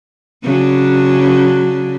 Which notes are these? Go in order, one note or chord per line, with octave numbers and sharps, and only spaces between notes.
C#3 F#3 D4